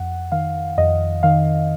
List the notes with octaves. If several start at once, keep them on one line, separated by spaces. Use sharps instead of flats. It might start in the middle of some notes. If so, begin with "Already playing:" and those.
Already playing: F2 F#5
D#3 F5
F2 D#5
D#3 F5